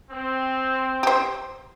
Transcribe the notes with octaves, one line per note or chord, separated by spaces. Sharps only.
C4
G4 C5